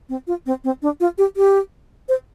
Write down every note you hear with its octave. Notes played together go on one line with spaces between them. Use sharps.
C4
F4
C4
C4
D4
F4
G4
G4
C5